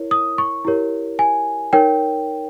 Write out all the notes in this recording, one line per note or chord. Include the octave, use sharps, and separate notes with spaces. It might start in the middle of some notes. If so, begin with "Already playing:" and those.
Already playing: E4 A#4 C#5
D#6
C#6
E4 G4 A#4 C#5
G#5
D#4 A#4 C#5 G5